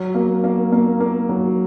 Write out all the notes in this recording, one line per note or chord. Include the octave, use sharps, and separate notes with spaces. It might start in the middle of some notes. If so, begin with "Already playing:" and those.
Already playing: F#3
A#3
A#3
A#3
A#3
F#3